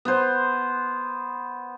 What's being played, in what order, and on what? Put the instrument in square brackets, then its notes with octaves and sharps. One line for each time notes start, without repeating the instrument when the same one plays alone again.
[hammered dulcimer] B3 C5